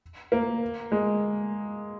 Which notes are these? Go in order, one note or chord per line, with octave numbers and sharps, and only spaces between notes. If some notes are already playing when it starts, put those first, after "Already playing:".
A#3
G#3